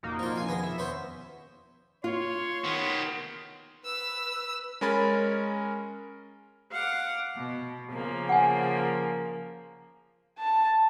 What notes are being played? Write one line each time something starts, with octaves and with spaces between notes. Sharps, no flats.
F1 F2 A#2 A#3 D#4 F#4
F3 F4
A#1 G#5 C7
B2 D#3 F3 B3 G#4 A#6
E5
E2 B3 C#4 C5
F4 C#5 C6
D#3 B3
B4 E6
G#3 C#4 A#4 G#5 B5 A6
F5 F#5 D6
B2
C#3 F3 A#3
F#5 G#5
A5